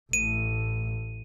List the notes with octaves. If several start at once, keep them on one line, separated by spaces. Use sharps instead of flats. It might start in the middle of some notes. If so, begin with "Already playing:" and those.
A1 A2 D#7